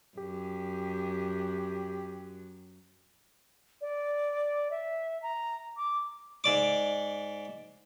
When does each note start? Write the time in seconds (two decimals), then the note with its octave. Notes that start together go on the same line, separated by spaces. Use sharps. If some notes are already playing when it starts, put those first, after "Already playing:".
0.18 F#2 G4
3.81 D5
4.71 E5
5.22 A#5
5.77 D6
6.44 G#2 D5 D6